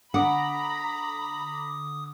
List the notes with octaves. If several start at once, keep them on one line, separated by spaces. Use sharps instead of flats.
D3 F#5 A#5 B5 D6 D#6